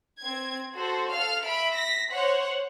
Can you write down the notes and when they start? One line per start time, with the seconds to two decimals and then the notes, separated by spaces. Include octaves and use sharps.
0.20 C4 G#6
0.75 F#4 A4 C5
1.12 A4 F5 F6
1.44 E5 B5 D7
1.73 A#6 B6
2.09 C5 C#5 F#5